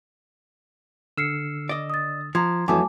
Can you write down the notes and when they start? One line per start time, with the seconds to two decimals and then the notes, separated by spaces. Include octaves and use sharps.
1.17 D3 E6 F6 C7 C#7
1.69 D5 D#5
1.90 D#6 A6
2.35 F3 A#5 C6 G#6
2.68 F2 E3 F#3 A3 F#4 G#5 A5 D6